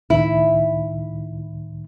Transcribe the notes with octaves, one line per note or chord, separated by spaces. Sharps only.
C#2 A2 D#3 E4